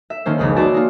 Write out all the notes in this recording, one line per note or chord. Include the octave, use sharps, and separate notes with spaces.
E5
D#3 A#3 C#4 C5
F1 C#2 C#3 G#4 B5
F#4 G#4 D5 E5 A5 C6
A#3 D#4